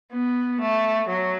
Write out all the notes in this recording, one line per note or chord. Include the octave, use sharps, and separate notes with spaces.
B3
A3
F#3